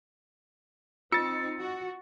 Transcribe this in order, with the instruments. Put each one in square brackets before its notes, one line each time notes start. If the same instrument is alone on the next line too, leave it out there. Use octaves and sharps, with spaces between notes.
[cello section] C4 D#4 [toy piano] F4 [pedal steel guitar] E6 [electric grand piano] A6 C#7
[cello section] F#4